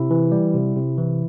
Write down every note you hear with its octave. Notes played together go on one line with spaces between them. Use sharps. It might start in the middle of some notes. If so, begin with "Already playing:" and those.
Already playing: C3 E4
E3
G3
C3
C3
E3